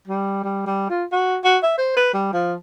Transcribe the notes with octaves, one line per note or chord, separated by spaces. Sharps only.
G3
G3
G3
F4
F#4
F#4
E5
C5
B4
G3
F3